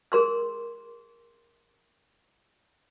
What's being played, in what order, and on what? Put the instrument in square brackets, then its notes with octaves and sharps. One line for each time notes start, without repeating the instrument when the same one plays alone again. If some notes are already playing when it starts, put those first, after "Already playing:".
[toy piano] G#4 A#4 C6 E6